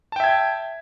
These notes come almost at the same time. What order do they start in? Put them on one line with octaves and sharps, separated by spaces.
A5 G5 E5 G#6